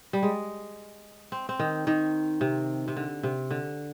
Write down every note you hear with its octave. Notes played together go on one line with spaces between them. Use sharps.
G3
G#3
C4
C4
D#3
D#3
C3
C3
D3
C3
D3